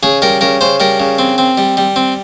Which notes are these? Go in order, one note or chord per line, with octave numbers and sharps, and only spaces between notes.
C#3 G#4
G3 A#4
C#3 A#4
C#3 C5
G3 A#4
C#3
C4
C4
G3
G3
C4